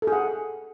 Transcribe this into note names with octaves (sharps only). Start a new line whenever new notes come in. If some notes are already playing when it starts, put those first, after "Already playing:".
A4
G#4
F#5